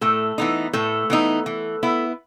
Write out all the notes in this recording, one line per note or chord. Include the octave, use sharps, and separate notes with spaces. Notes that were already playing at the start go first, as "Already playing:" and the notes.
A2 A3 A4
E3 B3 D#4
A2 A3 A4
E3 B3 D#4
E3
B3 E4